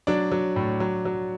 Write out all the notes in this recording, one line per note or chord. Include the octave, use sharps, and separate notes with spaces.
F#3 D4 D5
F#3
A2
F#3
F#3